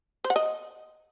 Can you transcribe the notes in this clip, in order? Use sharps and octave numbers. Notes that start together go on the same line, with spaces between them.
C5
F#5
D#5